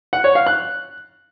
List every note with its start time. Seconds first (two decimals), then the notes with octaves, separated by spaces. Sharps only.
0.13 F#5
0.24 C#5
0.35 F5
0.47 F#6